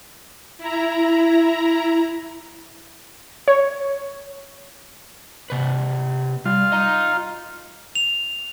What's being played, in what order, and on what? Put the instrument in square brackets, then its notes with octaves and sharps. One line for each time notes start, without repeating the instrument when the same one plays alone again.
[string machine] E4 A#5
[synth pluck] C#5
[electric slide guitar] C3 B4
[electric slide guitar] G3 [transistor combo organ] F4
[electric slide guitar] D#5 A#5
[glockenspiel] F7